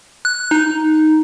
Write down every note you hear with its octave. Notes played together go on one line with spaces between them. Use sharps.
F#6
D#4